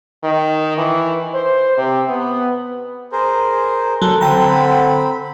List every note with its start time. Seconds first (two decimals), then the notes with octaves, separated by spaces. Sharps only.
0.23 D#3
0.78 E3
1.34 C5
1.77 C3
2.09 B3
3.12 G#4 A#4 C5
4.02 F#3 A4
4.21 D3 C4 G5 A#5 B5